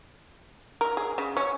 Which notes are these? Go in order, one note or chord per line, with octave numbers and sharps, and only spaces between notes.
A#4
G#4
C#3
C#4